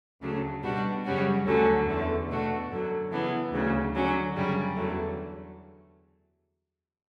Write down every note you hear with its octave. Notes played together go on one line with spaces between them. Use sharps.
D2 C#3 F#3 A3 D4
B2 G3 D4 F#4
F#2 C#3 G3 C#4 F#4
D2 D3 F#3 C#4
E2 D3 A3
B2 A3 D4 F#4
F#2 D3 F#3
C#3 E3 B3 D4
D2 C#3 F#3
D3 F#3 C#4
F#2 C#3 G3 C#4
E2 D3 F#3 A3